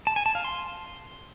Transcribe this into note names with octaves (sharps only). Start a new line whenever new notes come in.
A5
G#5
A5
F5
C6